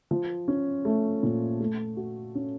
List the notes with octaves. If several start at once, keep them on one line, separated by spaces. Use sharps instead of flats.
F3
C#4
A3
A#2
A3
F#4
C#4